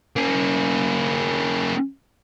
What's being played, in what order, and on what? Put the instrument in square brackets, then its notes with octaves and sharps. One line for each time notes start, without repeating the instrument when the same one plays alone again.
[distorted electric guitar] A#3 C#4